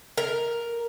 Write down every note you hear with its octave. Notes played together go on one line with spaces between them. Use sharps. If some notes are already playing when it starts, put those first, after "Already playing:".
A#4